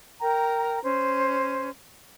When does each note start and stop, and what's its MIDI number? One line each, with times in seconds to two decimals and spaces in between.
0.21 0.81 70
0.21 0.81 79
0.21 0.81 82
0.83 1.70 61
0.83 1.70 72